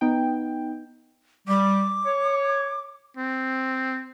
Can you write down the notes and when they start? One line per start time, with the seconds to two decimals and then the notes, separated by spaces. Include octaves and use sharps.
0.01 B3 D#4 G5
1.48 G3 D6
2.06 C#5
3.17 C4